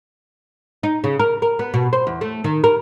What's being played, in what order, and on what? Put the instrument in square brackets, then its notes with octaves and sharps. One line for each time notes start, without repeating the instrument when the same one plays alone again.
[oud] D#4
C#3
A#4
A#4
B3
B2
C5
E2
A3
D#3
A#4